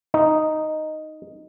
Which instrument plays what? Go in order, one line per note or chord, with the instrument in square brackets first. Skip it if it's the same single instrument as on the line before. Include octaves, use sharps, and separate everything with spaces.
[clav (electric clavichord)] D#4